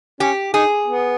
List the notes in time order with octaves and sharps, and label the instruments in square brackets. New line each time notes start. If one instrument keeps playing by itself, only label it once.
[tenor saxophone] C#4 [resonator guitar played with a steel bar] G4
[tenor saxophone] D#4 [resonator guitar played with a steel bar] G#4
[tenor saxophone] B3